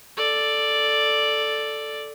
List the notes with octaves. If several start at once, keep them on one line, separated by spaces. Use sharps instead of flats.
A4 D5